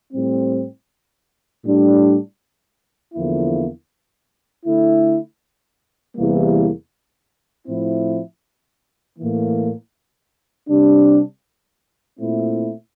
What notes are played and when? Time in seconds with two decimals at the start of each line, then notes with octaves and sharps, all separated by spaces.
0.13 A2 G3 C4
1.64 A2 G3 D4
3.14 E2 D3 F3 A#3 E4
4.66 D3 A3 E4
6.16 E2 C3 E3 G3 A#3
7.68 A2 F3 C4 E4
9.18 A2 E3 A#3
10.68 C3 G3 D4
12.20 A#2 A3 C4 E4